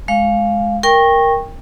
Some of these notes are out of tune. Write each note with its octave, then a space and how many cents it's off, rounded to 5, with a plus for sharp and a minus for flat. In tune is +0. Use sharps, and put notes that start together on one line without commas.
G#3 +15 F5 +0
A#4 +0 G5 +15 C#6 -20